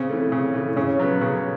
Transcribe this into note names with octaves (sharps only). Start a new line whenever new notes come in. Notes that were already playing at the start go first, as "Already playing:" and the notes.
Already playing: C#3 C4
E3 A3
C#3
E3 A3
C#3 C#4
F#3 B3
C#3